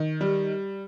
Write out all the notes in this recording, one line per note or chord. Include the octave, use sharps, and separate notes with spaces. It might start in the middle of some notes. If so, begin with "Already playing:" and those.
Already playing: D#3
G3